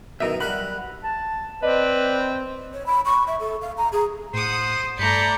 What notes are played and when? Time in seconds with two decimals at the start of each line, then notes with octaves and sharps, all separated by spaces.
0.20 F#2 B2 D#3 A#4 D#5 E5
0.40 G3 A4 A#4 F#5 B5
1.03 A5
1.63 C4 B4 D5 D#5
2.73 C#5
2.86 B5
3.05 C#6
3.27 E5
3.40 A4
3.62 F5
3.77 A#5
3.92 G#4
4.34 A2 C5 F#5 D#6
4.99 G2 A3 D5 A#5 B5 G6 C#7